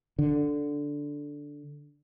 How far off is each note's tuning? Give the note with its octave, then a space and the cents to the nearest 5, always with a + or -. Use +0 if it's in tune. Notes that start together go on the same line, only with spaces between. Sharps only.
D3 -5